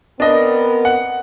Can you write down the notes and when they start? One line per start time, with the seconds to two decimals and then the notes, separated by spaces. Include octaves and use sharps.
0.20 B3 C4 D4 A#4 D#5
0.85 F#5